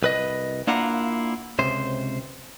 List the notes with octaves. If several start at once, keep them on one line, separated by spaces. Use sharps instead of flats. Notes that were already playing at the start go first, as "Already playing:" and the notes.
C2 B4 D#5
A#3 D4 E4 F4 F#5 A#5
C#2 C3 C5